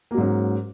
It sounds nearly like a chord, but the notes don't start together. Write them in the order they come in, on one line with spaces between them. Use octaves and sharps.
A#3 F#3 G#2 C#4